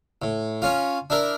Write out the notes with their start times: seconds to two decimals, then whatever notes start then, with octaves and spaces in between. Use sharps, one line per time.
0.22 A2
0.62 C#4 F4
1.10 D4 E4 A#4